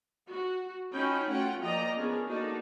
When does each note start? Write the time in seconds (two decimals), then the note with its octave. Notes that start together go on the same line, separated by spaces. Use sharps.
0.28 F#4
0.92 C#4 D#4 F4 F#4 G5 B5
1.30 A3 C#4 F4 F#5 G5
1.62 F3 A#3 D5 D#5 G5 A#5
1.95 B3 C#4 D4 G#4 A#4
2.27 A#3 D4 D#4 F#4 A4